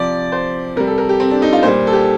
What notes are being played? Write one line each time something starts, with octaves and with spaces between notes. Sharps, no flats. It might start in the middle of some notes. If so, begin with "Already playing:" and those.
Already playing: C3 F3 D5
C5
C3 G3 A#4
A4
A#4
G4
C4
D4
D#4
F4
A#2 G3 C5
A4
G4